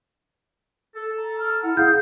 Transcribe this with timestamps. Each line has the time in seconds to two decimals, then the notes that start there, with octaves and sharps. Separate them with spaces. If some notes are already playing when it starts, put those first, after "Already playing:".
0.95 A4
1.18 A#5
1.39 F6
1.63 E4 F#5
1.77 G#4 F5 G6